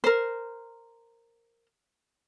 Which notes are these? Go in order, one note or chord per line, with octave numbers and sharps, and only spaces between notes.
A#4 C5